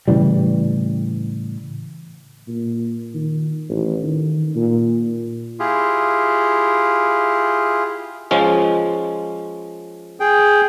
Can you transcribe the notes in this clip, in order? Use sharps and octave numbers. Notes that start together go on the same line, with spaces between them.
A2 C#3 E3 G3
A#2
D#3
A1
D#3
A#2
E4 F4 G4 G#4
F3 G#3 C#4
G#4 G5